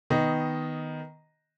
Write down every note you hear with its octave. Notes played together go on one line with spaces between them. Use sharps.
D#3 B3 D#5